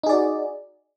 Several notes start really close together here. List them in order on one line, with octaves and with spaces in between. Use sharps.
D#4 G#4 D5 F#4